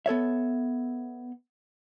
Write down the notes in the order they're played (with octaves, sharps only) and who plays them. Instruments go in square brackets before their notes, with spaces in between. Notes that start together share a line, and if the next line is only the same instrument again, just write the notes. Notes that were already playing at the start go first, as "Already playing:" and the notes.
[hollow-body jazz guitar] B3 A4 C#5 E5